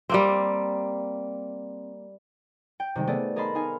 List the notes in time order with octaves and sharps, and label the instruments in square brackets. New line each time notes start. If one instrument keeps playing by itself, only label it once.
[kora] G3 A#3 C4
[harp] G5
C3 D#3 G3 G#3
A3 B3 G#4 D5
G#4 A#4 D#5 A5 B5 C6
D#4 F5 G#5